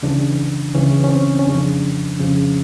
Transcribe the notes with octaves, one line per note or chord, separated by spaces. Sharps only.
C#2 C#3 E3 D4
C#2 C#3 E3 C#4
C#4
C4
C#4
F2 C#3 F3 D4
F2 C#3 F3 C#4